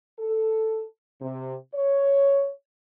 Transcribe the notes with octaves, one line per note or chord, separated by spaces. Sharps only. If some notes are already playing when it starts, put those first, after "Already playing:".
A4
C3
C#5